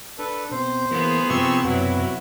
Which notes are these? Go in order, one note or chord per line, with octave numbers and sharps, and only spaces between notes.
D4 A4 B4
B2 C4 C5
E3 A#3 B3 G#4
C3 F3 C4 C#6 E6
F#2 B2 F#3 E4 F#4 B4